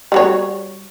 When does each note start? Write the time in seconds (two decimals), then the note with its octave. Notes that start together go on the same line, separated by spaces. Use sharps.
0.12 G3 F#4 C#5